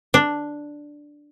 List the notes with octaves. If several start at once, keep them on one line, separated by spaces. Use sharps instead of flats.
D4